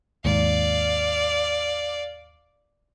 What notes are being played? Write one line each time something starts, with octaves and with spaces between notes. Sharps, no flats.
D#2 G#2 D5 F5